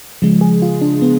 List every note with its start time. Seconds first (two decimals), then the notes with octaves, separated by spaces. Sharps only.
0.22 C#3 F3 G#3
0.41 G#4
0.62 F4
0.81 D4
1.02 B3